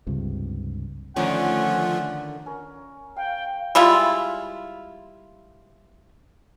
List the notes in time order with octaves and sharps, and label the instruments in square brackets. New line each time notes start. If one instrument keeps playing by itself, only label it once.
[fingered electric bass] C#2 G2 C3
[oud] D3 D#3 [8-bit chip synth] F3 A3 F4 [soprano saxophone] C#4 [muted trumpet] F#5
[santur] C#4 A#4
[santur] F5 [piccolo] G5
[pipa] G3 G#3 E4 F4